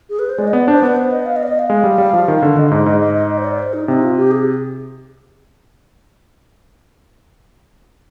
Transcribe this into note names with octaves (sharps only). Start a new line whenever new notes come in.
G#4
B4
C5
G#3 D5
D#5
B3 D5
D4 C5
B3 B4
C5
D#5
F5
D#5
D5
D#5
F5
G#3
G3
G3
F3
D#3
D3
D3 D#5
G#2 D#5
G#2 D#5
D#5
D#5
D#5
C5
D5
C5
D#4
C3 D#4
F4
G4
G#4